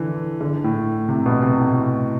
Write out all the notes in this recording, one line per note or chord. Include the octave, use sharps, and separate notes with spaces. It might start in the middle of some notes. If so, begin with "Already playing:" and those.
Already playing: D3 E3
D3
A2
C3
B2
C3
A2